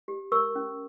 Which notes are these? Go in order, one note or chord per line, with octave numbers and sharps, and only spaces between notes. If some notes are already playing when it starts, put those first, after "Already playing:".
G4
A#4 C#6 E6
C#4